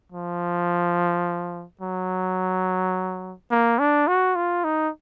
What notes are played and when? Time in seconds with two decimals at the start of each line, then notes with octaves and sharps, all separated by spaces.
0.12 F3
1.81 F#3
3.51 A#3
3.79 D4
4.08 F#4
4.36 F4
4.64 D#4